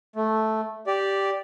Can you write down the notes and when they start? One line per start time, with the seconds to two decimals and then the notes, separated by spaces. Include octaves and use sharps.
0.16 A3
0.87 G4 D5